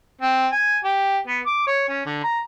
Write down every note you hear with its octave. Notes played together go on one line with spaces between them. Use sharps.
C4
G#5
G4
B3
D6
C#5
C#4
D3
A#5